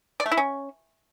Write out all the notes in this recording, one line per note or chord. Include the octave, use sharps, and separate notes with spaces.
D5
A3
E4
C#4